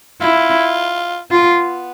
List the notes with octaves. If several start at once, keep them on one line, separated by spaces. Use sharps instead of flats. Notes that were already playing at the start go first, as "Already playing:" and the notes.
E4 F4
B3 F4